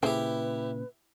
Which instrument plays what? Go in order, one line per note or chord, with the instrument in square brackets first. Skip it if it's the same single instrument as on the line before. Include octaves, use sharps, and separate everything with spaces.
[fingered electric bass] A#2 C#3 [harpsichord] E4 G4 [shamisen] G#4 C5 G5 [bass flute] B4